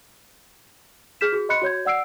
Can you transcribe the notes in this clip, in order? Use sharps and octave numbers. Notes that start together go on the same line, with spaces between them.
G#4 F6 G6 B6 E7
F#4 G#4
D#5 B5 C6 F#6 C#7
F#4 C#5 G6 G#6
D5 F#5 E6 C7 D7